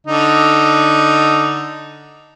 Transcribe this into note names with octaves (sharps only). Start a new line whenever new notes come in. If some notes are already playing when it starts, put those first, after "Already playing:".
D3 D#4